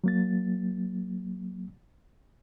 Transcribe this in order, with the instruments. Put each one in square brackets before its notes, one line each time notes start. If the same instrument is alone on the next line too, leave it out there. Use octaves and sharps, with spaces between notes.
[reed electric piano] F#3 A#3 A6